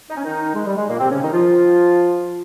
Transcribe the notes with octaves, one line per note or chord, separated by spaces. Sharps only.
D#4
C#4
D#3 D#4
G#3
G3
G#3
A#2 A#3
C3 C4
C#3 C#4
D#3 D#4
F3 F4